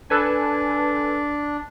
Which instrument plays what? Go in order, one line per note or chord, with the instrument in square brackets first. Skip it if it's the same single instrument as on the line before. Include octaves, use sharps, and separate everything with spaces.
[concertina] D4 [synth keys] A4 B4 G#5